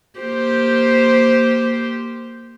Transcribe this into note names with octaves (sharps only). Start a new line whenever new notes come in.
A#3 G4 C5